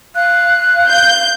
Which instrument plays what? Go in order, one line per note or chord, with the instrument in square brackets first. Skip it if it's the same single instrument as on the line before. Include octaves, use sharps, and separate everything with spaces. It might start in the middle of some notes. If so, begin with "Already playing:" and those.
[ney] F5 [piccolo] F#6
[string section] G6